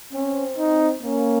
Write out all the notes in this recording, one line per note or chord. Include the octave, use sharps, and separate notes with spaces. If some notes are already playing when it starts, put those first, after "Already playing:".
C4 C#4
D#4
A#3 C#4